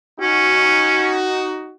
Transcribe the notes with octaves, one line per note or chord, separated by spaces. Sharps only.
C#4 D#4 F#4